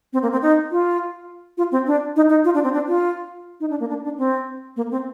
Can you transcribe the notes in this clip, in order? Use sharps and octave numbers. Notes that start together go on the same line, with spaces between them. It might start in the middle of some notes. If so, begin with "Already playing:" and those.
C4
A#3
C4
D#4
F4
F4
C4
D4
D#4
D#4
F4
D4
C4
D4
F4
D#4
D4
A#3
D4
D4
C4
A#3
C4